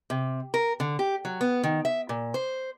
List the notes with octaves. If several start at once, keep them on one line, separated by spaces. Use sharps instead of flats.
C3
A#4
D3
G4
F#3
B3
D#3
E5
A#2
C5